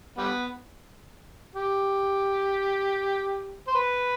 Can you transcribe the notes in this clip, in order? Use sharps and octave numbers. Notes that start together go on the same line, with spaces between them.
G3 B3
G4
C5
B4